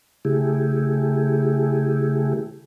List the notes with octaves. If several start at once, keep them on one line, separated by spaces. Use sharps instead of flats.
C#3 A3 E4 G4 G#4